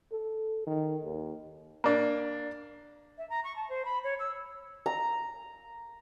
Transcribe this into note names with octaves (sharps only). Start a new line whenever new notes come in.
A4
D#3
D#2
A#3 D4
E5
A#5
C#6
A5
C5
B5
C#5
E6
A#5